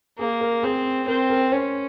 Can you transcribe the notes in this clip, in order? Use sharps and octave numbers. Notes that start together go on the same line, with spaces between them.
A#3 G#4
A#4
C4 G#4
C4 A#4
A#4
C#4 C5